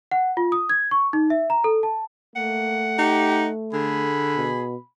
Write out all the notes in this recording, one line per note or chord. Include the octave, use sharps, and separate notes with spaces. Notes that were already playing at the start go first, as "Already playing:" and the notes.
F#5
F4
D#6
G#6
C#6
D#4
E5
A#5
A4
A5
A3 A#3 F#5
D#4 G4
D3 G#4 B5
B2